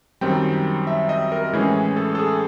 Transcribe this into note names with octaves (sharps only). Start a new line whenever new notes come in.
F#2 D#3 G3 C4 G5
E5
D#5
A#4
A2 E3 G#3 C#4 G#4
A4
A4
G#4